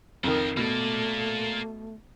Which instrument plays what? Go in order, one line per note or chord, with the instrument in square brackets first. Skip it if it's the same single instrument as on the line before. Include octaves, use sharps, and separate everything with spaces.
[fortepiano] F2 D#3 [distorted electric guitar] F3 A#4
[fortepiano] B2 [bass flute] A3 [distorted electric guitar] A#3 D5